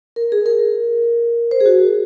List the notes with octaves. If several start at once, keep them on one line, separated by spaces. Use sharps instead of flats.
A#4
G#4
A#4
C5
G#4
F#4